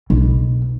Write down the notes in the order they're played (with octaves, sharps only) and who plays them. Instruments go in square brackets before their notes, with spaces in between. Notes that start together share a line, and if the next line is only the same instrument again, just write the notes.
[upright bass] B1